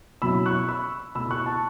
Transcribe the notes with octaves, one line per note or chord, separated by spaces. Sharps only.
B2 F#3 C#4 E4 B5 E6
C#6 F#6
B5 E6
B2 A3 E4 B5 E6
C#6 F#6
A5 C#6